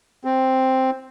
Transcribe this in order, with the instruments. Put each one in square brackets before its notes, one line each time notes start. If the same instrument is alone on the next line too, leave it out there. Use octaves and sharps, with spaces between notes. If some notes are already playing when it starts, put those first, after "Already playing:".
[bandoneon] C4